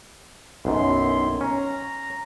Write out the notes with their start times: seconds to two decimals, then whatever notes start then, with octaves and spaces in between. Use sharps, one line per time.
0.65 B1 F#2 D#3 E4 C6
1.41 C#4 A#5